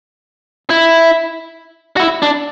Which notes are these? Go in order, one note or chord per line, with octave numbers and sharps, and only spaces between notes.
E4
F#4
E4
D4